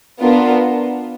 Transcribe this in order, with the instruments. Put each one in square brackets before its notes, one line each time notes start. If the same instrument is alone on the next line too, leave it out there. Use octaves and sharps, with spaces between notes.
[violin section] B3 D4 F4 A#4